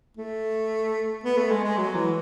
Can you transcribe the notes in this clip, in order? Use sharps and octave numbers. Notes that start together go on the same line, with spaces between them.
A3
B3
A3
G#3
G#3
F#3
E3